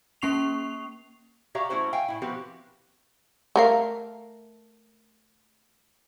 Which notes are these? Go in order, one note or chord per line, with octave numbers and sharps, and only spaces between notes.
A#3 C#4 C#6 C7 F7
F#4 G4 C#5 E5 F5 A#5
A3 C#4 E4 F#4 C5
E5 F5 G5 G#5
A2 E4
F3 B3 C4 F#4 G4 B4
A3 A#4 F5